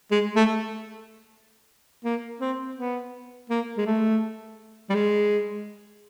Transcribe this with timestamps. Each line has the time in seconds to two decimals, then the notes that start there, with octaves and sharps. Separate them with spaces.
0.11 G#3
0.36 A3
2.05 A#3
2.41 C4
2.77 B3
3.50 A#3
3.78 G#3
3.86 A3
4.90 G3
4.95 G#3